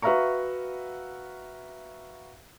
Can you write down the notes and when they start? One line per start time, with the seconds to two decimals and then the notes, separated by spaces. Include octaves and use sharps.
0.02 F#4 B4 E5 F5 A#5 C#6